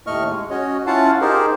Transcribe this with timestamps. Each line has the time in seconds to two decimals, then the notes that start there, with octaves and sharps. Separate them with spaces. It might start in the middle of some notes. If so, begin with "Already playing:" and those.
0.07 D#2 A2 A3 D#5 C#6 F6
0.30 G#3
0.50 C#4 F#4 C#5 D#5
0.87 C#4 E4 F4 F5 F#5 A5
1.21 D#4 G4 G#4 A#4 C5